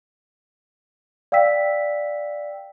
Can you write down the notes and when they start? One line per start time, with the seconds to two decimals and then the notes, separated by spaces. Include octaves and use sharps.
1.32 D5 F5 G5 E6 B6